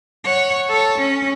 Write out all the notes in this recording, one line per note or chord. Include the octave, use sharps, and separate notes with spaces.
C#5 F#5
A4 C#5
C#4